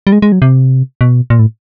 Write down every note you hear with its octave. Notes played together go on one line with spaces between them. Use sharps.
G3
G#3
G#3
F#3
C3
B2
A#2
A2